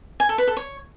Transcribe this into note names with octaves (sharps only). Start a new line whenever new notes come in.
G#5
A4
B4
A4
C#5